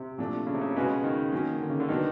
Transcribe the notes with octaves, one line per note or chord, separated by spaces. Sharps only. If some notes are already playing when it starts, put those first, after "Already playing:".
Already playing: C3
A#2 F3 A3 D4
C#3
C3
C#3
B2 G#3 C#4 F#4 B4
D#3
F#3 A#3 C#4
D3
C#3
D3
B2 D#3 F#3 B3 D4